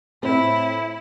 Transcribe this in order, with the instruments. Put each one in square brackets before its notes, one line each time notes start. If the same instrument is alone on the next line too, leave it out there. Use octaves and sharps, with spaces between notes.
[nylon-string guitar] A2 C4 [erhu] E4